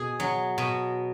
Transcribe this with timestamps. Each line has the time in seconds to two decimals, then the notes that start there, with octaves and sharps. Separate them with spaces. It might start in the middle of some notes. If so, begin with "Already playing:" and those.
Already playing: B2 G#4
0.20 F#3
0.58 B2